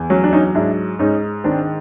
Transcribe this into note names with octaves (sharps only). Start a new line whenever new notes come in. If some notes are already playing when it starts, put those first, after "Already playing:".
Already playing: E2
F#3 C#4
D4
C#4 D#4
G#2 D4 E4
G#2 C#4 D#4
D#3 C4 D4